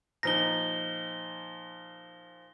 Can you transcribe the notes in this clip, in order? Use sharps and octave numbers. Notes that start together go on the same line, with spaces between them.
A#2 F3 D#4 A#6 G7